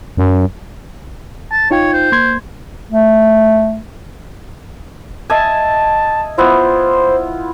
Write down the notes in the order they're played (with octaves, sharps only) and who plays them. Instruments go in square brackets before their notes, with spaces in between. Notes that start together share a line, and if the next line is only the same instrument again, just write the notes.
[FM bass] F#2
[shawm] A5
[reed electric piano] D#4 F4 G5 [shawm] C#5
[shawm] C5
[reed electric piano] A#3 C6 G#6
[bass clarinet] A3
[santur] D#5 E5 G#5 [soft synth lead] A5
[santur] B3 E4 F4 [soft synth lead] C5